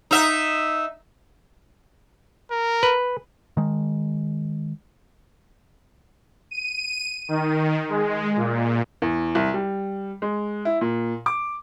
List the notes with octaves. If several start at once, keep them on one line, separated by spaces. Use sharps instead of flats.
D#4 E5
A#4
B4
D#3 G#3
D#7
D#3
G#3
A#2
E2
C2
G3
G#3
E4
A#2
D6